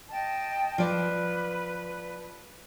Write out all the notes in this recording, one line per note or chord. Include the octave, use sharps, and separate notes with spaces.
D#5 G5 A5
F3 B4 D5